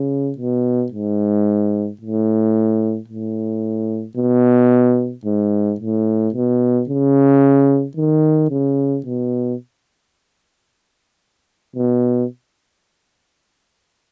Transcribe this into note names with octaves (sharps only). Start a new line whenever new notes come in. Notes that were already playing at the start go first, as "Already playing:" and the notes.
Already playing: C#3
B2
G#2
A2
A2
B2
G#2
A2
B2
C#3
D#3
C#3
B2
B2